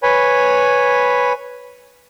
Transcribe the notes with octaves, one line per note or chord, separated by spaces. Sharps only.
B4 C#5 G#5 B5